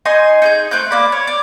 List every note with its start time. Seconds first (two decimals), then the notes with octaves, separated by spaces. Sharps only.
0.05 D#4 D#5 G#5 C6
0.42 D#4 G#4 G6
0.71 A3 C4 F#6 G6
0.91 A#3 D5 B5
1.12 C#5
1.27 D5